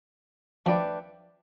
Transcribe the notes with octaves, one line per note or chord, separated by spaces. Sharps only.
F3 A3 D4 G4 B4 D5